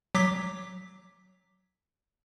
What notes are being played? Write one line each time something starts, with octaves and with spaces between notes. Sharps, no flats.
F#3 D6 B6